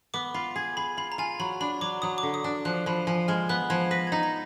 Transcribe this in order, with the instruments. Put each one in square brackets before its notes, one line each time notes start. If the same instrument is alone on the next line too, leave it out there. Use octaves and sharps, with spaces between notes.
[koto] B3 [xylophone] D6
[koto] F4 [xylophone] B5
[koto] G#4
[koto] G#4 [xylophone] B5
[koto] F4 [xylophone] B5
[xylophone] A#5
[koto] F4 [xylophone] G#5
[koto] F#3 [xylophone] B5
[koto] D4 [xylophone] B5
[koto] F#3 [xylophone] D6
[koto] F#3 [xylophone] D#6
[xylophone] D6
[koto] D3
[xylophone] D#6
[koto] D4
[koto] F3 [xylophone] F#6
[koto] F3 [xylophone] B5
[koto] F3 [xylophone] G#5
[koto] G#3 [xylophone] F6
[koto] B3 [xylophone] F#6
[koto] F3 [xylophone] G#6
[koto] B4 [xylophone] A#6
[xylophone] G#6
[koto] D#4
[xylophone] A#6